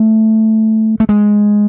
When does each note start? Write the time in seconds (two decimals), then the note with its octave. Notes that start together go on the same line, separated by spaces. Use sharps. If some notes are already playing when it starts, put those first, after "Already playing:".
Already playing: A3
1.00 A3
1.09 G#3